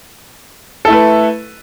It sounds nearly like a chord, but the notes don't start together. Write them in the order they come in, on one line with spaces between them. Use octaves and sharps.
A4 E4 A3 B4